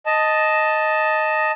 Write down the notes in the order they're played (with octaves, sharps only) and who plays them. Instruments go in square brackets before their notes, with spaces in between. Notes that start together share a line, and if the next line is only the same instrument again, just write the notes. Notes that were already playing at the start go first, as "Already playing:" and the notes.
[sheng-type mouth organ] D#5 A5